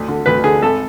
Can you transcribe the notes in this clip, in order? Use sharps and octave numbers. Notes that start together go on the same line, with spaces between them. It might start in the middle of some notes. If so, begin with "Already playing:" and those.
Already playing: D2
D3
D2 B4
D3 G#4
G#1 A4